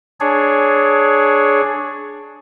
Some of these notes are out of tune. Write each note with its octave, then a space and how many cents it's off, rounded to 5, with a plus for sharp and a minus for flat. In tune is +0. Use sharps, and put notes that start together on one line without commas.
D4 +5 G#4 +15 C#5 +0